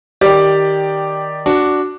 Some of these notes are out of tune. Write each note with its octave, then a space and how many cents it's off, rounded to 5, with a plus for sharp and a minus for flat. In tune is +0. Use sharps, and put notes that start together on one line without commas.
D#3 +0 G4 +0 D5 +0
D4 +0 F#4 +0